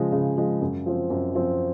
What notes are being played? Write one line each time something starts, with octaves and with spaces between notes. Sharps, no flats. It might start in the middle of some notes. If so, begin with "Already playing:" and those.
Already playing: C#3 F3 G#3
C#3
F3 G#3
F#2
F3 C4
F#2
F3 C4